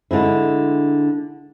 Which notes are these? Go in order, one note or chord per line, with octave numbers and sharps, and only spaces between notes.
D3 G#3 E4